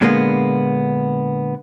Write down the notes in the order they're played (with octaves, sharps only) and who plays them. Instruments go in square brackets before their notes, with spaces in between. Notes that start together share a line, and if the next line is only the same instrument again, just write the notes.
[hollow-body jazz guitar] A#2 D3 G#3 A#3 B3